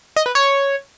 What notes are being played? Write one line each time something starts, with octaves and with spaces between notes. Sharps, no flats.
D#5
B4
C#5